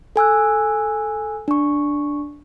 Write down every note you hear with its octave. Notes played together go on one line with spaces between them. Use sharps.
A4 G#5 E6 F#6
D4 C#6